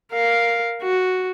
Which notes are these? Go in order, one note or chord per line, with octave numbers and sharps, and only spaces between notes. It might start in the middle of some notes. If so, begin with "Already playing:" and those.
A#4 F5
F#4